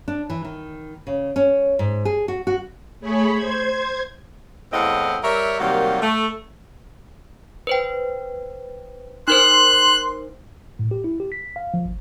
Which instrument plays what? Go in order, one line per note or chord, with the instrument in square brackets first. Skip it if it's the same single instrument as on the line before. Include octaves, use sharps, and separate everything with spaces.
[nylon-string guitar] D4
E3
D#3
C#3
C#4
G#2
G#4
F#4
F#4
[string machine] A3 G#4 C#5 B5
C5 G#6
[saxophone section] E2 A2 C4 D#5 F5 F#5
G3 A#4 C#5 E5
C3 D#3 F#3 G3 A#3
A3
[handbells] B4 C5 G5
[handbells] D#4 A#4 C5 [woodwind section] C6 [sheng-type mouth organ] F#6
[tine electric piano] A2
G4
E4
G4
B6
F5
F3
G#1